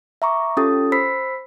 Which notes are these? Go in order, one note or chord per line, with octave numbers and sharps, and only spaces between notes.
E5 A#5 C#6 D6
C#4 F4 G4 A4 D#6 A6
C5 B5 E6 B6 C7